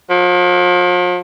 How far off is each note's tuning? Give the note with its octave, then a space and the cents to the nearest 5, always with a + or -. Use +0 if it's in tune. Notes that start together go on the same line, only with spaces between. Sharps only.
F3 +40